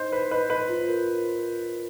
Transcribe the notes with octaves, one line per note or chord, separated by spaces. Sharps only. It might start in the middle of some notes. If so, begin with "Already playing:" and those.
Already playing: D#4 C5 D#5
B4 D#5
B4 D#5
B4 D#5
F4
A#4